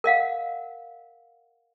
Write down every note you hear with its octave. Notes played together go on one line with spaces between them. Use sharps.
A#4 D#5 F5 F#5